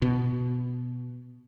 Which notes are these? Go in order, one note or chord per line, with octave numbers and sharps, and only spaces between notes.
B2